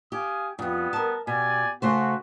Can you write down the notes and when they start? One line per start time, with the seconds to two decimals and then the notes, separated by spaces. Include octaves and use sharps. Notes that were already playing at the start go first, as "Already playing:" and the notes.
0.12 G4 F5 G#5 D#6
0.59 F2 G#2 G3 B3 D#6
0.93 A#4 A5
1.27 B2 G4 D5 G#5
1.82 C#3 A3 F#4 C5